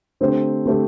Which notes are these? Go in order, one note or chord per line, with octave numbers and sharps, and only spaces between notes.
D3 A3 C4 G4 C5
D3 A3 C4 G4 C5